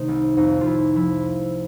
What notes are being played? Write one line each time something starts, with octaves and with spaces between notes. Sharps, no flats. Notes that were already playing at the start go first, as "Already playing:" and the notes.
Already playing: C3 D#3 A3 D#4
C2
F2 D#4
F2 E4 F4
F3 E4